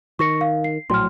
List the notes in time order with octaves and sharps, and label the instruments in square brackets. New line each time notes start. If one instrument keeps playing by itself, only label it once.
[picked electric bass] D#3 [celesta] C#6 A#6 C#7
[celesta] F5
C7
[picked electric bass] A#1 A2 F#3 [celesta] C6 F6